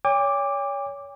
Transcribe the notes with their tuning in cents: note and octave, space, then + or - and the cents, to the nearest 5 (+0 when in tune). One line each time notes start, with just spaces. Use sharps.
C#5 +30 G5 +45 D6 +0